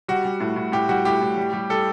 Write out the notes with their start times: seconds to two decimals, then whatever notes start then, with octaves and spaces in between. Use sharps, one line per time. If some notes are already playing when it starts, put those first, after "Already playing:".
0.08 G3 F#4
0.25 G3
0.40 A2
0.56 A2
0.72 A2 G4
0.89 G3 F#4
1.05 A2 G4
1.22 A2
1.38 G3
1.53 G3
1.70 G3 A4